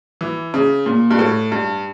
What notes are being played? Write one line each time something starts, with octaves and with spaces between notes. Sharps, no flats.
E3
C#3
A#2
G2
A2
G2